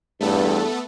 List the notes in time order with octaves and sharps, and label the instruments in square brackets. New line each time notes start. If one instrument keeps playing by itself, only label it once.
[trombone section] E2 G2 [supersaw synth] A3 B3 A4